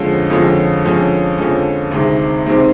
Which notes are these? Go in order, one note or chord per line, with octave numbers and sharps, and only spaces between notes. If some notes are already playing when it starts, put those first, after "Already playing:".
Already playing: F2 D3 F3 G#3 C#4
F2 D3 F3 G#3 C#4
F2 D3 F3 G#3 C#4
F2 D3 F3 G#3 C#4
D2 C3 D#3 G#3 C4
C3 D#3 G#3 C4